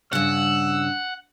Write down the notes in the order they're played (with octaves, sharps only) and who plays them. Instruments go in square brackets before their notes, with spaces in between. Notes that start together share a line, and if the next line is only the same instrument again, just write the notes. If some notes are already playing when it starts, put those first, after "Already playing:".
[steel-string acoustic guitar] G2 C#3 [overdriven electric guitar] F#5 [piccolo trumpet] E6